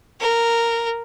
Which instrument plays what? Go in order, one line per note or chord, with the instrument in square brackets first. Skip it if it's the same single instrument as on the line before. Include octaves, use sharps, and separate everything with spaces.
[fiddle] A#4